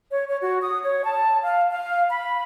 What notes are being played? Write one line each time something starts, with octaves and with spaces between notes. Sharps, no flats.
C#5
C#5
F#4
D#6
C#5
A5
F5
F5
B5